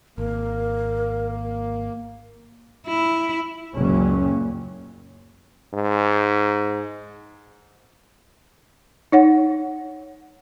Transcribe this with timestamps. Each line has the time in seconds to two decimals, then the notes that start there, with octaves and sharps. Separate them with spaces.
0.18 G#1 A#3 A#4
2.87 E4
3.75 F#1 C#2 A#2 F#3 C#4
5.74 G#2
9.12 D#4 C#5 F#5